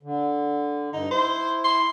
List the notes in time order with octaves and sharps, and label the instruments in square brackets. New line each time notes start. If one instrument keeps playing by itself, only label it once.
[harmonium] D3
[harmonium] G2 [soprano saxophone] D#4
[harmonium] E4 [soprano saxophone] C5
[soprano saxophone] C6